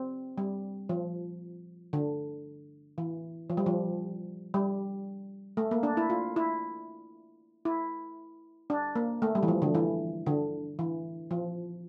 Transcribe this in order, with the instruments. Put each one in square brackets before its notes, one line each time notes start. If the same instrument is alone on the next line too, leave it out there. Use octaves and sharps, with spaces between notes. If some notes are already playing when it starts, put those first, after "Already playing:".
Already playing: [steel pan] C4
G3
F3
D3
E3
F3
G3
F3
G3
A3
A#3
D4
E4
F4
E4
E4
D4
A#3
A3
G3
E3
F3
D3
E3
D3
E3
F3